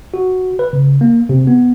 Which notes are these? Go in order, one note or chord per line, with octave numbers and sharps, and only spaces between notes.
F#4
B4
C#3
A#3
C3
B3